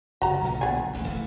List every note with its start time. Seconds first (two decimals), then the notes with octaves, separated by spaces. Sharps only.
0.22 F#1 G2 F#4 A#5
0.44 B1 A#2 D3
0.61 B3 G#5
0.93 D1 A1 D#2
1.08 F#1 E3 A3